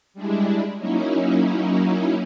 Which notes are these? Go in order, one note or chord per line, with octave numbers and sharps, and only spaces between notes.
G3 G#3 D4 E4
F#3 A#3 C#4 D#4 E4